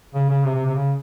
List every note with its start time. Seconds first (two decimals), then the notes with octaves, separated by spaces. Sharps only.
0.15 C#3
0.30 C#3
0.45 C3
0.55 C3
0.66 C3
0.75 C#3